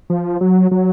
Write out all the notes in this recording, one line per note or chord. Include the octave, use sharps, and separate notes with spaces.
F3
F#3
F#3